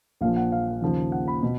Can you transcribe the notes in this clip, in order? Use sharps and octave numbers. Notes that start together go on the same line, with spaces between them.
A#1 A#2 F3 F5
F#5
F5
D#2 C#3 F3
F#5
B5
B2